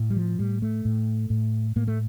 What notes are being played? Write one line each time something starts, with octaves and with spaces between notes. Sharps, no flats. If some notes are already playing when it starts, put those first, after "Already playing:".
Already playing: A2
G3
F3
A2 G3
A3
A2
A2
A2 A#3
A3